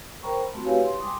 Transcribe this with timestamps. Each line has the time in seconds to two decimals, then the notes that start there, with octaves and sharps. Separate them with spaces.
0.23 A#4 C5 G5 A#5 B5 C#6
0.39 B5
0.53 A3 C4 F#4
0.65 E4 G4 B4 C#5 F5 G#5
0.84 C6
1.00 G3 G#5 C6 D6 D#6